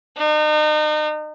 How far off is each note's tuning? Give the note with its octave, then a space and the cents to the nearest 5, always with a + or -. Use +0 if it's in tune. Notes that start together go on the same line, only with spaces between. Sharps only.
D#4 -35